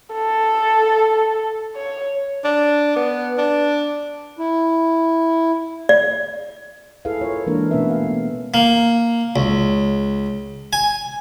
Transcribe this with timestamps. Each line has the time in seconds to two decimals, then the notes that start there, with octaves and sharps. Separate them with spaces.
0.14 A4
1.76 C#5
2.45 D4
2.96 B3
3.38 D4
4.39 E4
5.89 D5
7.05 E4 G#4 A4 B4 F5
7.21 F4 A#4 C#5
7.47 E3 G#3 A#3 D4 A#4
7.71 B2 A3 B3 C#4 B4 E5
7.90 F5
8.07 B3
8.54 A#3
9.36 C#2
10.73 G#5